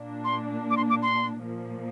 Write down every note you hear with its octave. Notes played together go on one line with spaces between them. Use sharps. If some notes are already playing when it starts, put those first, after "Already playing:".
Already playing: A#2 A#3 D4
C6
D6
C6
D6
C6
A#2 F3 A#3